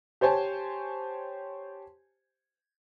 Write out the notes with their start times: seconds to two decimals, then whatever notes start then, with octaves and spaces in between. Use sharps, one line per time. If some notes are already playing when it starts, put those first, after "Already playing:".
0.21 G4 C5 C#5 G#5 A5